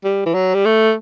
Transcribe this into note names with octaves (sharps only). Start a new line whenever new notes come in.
G3
E3
F#3
G3
A3